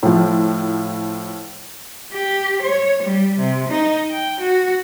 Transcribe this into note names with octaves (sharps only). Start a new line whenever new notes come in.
A2 F3
G4
C#5
G3
C3
D#4
G5
F#4